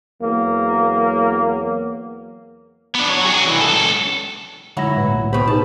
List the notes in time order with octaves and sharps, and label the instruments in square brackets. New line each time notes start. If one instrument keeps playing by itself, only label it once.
[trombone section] E2 F#3 A#3
[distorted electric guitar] B3 D4
F#3 C#5
F#4 G#4
C2 E3
C#2 A4
[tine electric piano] D3 G#3 A#6 [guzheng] F#3 E4
[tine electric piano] A2 B4
B1 A2 A#3
[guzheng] B2 B5 [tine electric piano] B3 G4 C5
[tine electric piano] D#4 G#4 [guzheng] A5